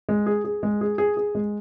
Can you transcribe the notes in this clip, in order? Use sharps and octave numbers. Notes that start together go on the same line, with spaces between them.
G#3
G#4
G#4
G#3
G#4
G#4
G#4
G#3